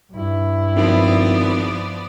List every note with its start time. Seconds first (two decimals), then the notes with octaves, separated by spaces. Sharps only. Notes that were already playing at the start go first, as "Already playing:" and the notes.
0.12 G2 E4
0.76 G#1 F3 B3 D5